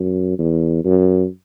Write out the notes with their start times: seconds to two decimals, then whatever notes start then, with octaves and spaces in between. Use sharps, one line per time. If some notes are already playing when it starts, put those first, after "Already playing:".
Already playing: F#2
0.39 E2
0.84 F#2